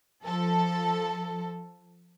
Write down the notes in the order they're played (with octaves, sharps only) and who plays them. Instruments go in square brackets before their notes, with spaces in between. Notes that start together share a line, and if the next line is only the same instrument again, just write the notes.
[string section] F3 A4